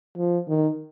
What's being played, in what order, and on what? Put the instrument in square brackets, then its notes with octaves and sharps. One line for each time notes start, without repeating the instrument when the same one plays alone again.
[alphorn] F3
D#3